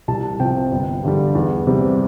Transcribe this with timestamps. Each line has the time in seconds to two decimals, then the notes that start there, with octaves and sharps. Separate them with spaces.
0.08 C2 A5
0.40 C3 F3 G5
0.72 G1
1.03 G2 D3 G3
1.35 E2
1.67 C3 G3